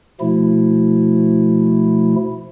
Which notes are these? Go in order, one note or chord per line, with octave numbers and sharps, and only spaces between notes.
B2 F3 A3 E4